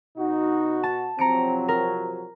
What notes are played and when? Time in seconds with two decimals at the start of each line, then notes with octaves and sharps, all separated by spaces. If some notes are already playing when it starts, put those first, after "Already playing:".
0.18 B2 D#4 F#4
0.83 A5
1.19 C3 F3 F#3 C4 A#5 C#7 D7
1.68 A#4